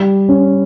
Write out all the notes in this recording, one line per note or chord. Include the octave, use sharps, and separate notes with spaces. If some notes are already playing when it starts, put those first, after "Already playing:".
Already playing: G3
C#4